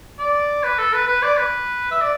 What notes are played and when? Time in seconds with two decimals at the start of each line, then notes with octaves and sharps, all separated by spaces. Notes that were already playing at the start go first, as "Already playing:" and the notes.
0.19 D5
0.63 B4
0.78 A4
0.93 B4
1.08 B4
1.22 D5
1.37 B4
1.91 E5
2.01 D5